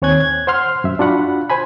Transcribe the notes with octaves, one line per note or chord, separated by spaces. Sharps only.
D#2 C4 C#5 G#5 F#6 G#6
G#6
C5 F#5 C6 F6
F#2 E5
D4 F4 F#4 F#5 B5
C5 G#5 B5